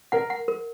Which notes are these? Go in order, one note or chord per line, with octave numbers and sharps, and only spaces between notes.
A#4 F#5
F#5
A#4